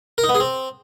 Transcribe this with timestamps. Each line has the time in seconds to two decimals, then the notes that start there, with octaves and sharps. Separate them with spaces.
0.18 A#4
0.24 D#4
0.29 B3
0.35 G#4
0.40 C4